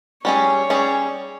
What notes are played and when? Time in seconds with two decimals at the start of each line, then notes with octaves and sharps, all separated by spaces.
0.25 G3 C#4 G#4 C#5
0.70 G3 C#4 G#4